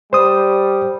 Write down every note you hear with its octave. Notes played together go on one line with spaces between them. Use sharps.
G3 C5 D#6